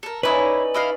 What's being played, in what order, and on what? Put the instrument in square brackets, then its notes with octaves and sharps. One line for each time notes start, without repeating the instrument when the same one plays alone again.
[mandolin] A4 A#4
[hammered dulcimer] C#4 D#4 D5 [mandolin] E4 C#5 [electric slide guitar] B4
[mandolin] E4 D#5 F5